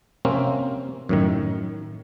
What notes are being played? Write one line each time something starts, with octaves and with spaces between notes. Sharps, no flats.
C3 A#3 C4 C#4
F#2 A2 D#3